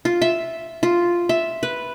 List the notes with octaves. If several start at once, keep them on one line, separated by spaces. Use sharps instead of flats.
F4
E5
F4
E5
B4